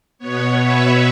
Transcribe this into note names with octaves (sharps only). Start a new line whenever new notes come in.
B2 B3 C#5
B4 E5